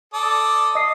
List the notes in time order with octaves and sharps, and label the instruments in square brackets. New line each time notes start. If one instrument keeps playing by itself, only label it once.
[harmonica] A4 D5 D#6
[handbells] D#5 D#6 C7